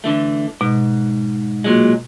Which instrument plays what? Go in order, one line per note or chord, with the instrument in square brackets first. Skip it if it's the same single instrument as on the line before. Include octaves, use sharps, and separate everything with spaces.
[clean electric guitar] D3 E3 A3
[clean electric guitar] G#2 [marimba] B2
[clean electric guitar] A#2 F#3 G#3